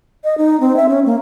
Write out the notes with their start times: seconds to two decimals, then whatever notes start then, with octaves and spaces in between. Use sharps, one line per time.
0.24 D#5
0.38 D#4
0.60 C4
0.76 E5
0.89 C#4
1.06 A#3